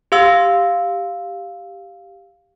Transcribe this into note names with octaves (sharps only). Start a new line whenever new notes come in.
G4 F5 E6